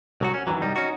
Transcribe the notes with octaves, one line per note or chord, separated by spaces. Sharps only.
C2 F#3 F#4
C#4
F#2 D#3 E3 F#3
C2 G3 D#4
C#4 D#4 F#4